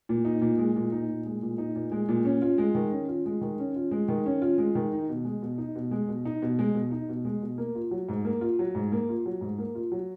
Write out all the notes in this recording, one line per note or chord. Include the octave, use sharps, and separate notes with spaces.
A#2
D#4
A#2
G#3
A#2
D#4
A#2
G#3
A#2
D#4
A#2
G#3
A#2
C#4
F4
G#3
D#3
C#4
F4
G#3
D#3
C#4
F4
G#3
D#3
C#4
F4
G#3
D#3
D#4
B2
G#3
B2
D#4
B2
G#3
B2
D#4
B2
G#3
B2
D#4
B2
G#3
B2
A#3
F4
F#3
G#2
A#3
F4
F#3
G#2
A#3
F4
F#3
G#2
A#3
F4
F#3